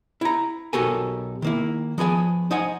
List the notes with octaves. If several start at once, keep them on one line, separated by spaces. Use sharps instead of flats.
E4 A#5
B1 F#4 G4 A4 A#4 G#5
D#3 A#3 E4
F3 B3 G#4 G#5
D#4 C5 D#5 F#5 G#5